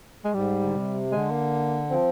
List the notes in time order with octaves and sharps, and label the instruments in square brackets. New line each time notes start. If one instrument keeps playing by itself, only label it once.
[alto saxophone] G#3
[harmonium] G#2 [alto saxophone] G3
[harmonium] D3
C3
[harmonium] D3 [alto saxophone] G#3
[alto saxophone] A#3
[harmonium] F3 [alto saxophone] C4